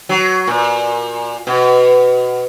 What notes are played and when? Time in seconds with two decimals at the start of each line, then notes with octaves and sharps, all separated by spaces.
0.09 F#3
0.47 A#2
1.47 B2